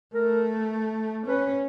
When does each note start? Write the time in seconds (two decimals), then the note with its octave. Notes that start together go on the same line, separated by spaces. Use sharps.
0.14 A3 A#4
1.26 C#4 B4